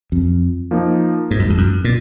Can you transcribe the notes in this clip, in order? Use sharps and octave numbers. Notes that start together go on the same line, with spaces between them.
F2
F3 A#3 D#4
G#2
F#2
F2
F#2
A#2